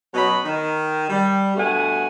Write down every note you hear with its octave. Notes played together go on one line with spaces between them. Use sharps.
B2 F#3 C#4 D#5 B5
D#3
G3
G2 B2 A3 F#5 G#5